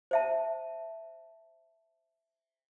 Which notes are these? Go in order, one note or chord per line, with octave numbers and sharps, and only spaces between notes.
C5 E5 A5